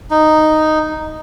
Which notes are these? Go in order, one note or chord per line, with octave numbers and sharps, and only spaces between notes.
D#4